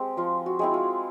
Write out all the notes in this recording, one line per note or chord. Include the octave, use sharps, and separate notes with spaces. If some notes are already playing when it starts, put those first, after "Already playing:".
Already playing: G#3 C4 G4
F3 F4
F#4
G#3 C4 E4
F4